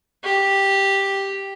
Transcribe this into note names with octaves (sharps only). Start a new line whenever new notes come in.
G4